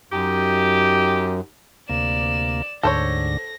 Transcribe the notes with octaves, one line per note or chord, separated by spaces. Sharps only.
F#2 D#4 G4
D2 C3 A#3 D5 E7
D2 G#2 D3 A4 C5 C#5 A#6